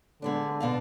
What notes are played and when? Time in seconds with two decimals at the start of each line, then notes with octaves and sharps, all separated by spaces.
0.22 D3 G#3 B3 D4
0.60 B2 D4 F5